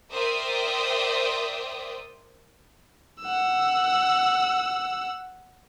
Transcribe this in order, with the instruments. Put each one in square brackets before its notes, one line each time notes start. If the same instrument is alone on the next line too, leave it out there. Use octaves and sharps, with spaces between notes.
[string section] A#4 C5 D5 E5 G5 D#6
[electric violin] F#5 E6